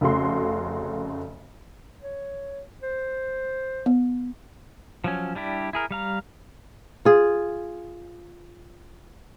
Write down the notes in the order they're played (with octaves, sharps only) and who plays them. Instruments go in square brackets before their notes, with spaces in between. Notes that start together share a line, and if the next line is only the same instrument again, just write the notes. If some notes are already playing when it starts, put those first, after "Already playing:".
[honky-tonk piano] F1 C#3 A3 F#4 C6
[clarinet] C#5
C5
[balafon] B3
[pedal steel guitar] F3 F#3 C#4
G3 D4 E4 G4
E4 G#4 A#4
G3 F5 A#5
[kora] F4 G#4